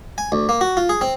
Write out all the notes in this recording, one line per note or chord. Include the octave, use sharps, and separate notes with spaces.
G#5
D2
A#3
F#4
F4
G#4
C4